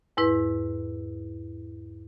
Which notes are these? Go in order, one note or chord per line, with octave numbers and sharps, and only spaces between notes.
E2 G#2 E4 B4